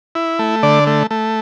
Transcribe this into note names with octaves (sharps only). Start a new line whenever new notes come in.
E4
A3
D3 D5
A3
A3